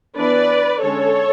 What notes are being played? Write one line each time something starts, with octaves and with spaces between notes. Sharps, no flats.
E3 B3 D4 B4 D5
D3 G#3 C#4 A4 C#5